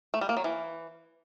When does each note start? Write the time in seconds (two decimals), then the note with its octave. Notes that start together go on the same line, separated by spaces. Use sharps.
0.14 A3
0.21 G3
0.29 A#3
0.37 F#3
0.44 E3